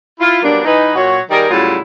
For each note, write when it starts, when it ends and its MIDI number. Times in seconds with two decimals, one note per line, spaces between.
0.20 0.38 64
0.20 0.38 65
0.43 0.65 54
0.43 0.65 55
0.43 0.65 58
0.43 0.65 59
0.43 0.65 62
0.65 0.95 52
0.65 0.95 63
0.65 0.95 71
0.96 1.20 46
0.96 1.20 54
0.96 1.20 66
0.96 1.20 73
1.31 1.49 51
1.31 1.49 55
1.31 1.49 63
1.31 1.49 68
1.31 1.49 70
1.50 1.79 45
1.50 1.79 49
1.50 1.79 54
1.50 1.79 55
1.50 1.79 64
1.50 1.79 65